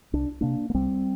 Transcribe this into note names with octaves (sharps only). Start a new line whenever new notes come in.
C2 D4
C3 A#3 D4
A#3
C2 G3 C4